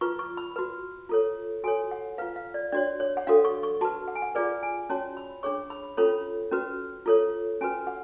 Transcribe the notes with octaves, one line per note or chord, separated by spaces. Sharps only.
F4 B4 C#6
C#6
B5
F#4 B4
F4 A4 C#5
F#4 A4 C#5 G#5
F#5
F4 B4 F5
F5
D5
D4 F#4 C#5 D5
C#5
F#5
D4 F#4 A4 F5
C#6
C#6
F#4 B4 A5
F#5
G#5
F#5
F4 G#4 B4 D5
G#5
C#4 F#4 C#5 A5
B5
D4 G#4 C#5 C#6
B5
C#4 F4 A4 C#5 B5
C#4 F#4 B4
F4 A4 C#5
C#4 F#4 B4 G#5
F#5